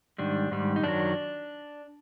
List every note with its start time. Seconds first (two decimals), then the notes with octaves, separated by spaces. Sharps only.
0.18 G#2 D#3 G3 D4
0.51 G#2 D#3 G3
0.76 D#4
0.83 F#2 D#3 F#3 D4